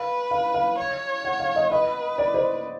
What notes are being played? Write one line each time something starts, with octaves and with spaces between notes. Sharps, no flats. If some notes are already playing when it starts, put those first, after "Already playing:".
Already playing: B4 F5
F5
F5
C#5
F#5
F5
D#5
B4 D#5
D5
C5